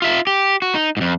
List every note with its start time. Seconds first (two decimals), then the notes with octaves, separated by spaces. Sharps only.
0.02 F4 E5
0.27 G4
0.62 F#4
0.75 D#4
0.97 F2 G#2